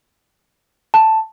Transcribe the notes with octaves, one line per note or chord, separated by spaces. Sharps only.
A5